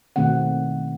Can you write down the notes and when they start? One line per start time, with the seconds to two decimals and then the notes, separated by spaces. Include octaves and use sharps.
0.16 B2 D#3 A3 C4 F#5